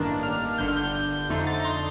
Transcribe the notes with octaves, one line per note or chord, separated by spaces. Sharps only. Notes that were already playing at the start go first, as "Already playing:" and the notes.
Already playing: A1 G2 D#3 A#3 D4
F6
G1 G2 D3 G6
F6
G6
G6
F2 D3 A3 D#4
A6
A#5
C6